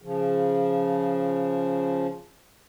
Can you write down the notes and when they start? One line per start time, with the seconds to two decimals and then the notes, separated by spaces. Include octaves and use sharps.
0.02 C#3 F3